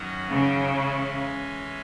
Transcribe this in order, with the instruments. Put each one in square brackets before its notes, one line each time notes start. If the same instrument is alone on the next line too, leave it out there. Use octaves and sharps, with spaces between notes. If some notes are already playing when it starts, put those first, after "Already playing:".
Already playing: [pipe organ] F#2 D#3 F#3 C#4 F#4
[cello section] C#3
[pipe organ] E3 G#3 C#4 E4